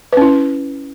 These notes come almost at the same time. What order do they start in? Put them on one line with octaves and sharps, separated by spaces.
B4 C#4 E4